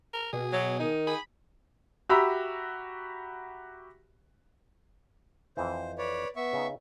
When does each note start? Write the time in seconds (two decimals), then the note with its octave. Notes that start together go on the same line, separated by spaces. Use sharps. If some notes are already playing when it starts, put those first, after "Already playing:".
0.14 A#4
0.33 B2 G#4
0.52 F#3
0.80 D#3 D#4
1.07 G#4 B5
2.09 F#4 G4 E5 A#5 B5 E6
5.57 F2 E3 C5
5.98 B4 C#5 D5
6.36 B3 E5 C#6
6.53 C#3 D#4